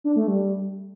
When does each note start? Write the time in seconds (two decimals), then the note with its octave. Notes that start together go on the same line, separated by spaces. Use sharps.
0.04 D4
0.16 A3
0.28 G3